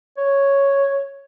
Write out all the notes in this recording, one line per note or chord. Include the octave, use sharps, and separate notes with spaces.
C#5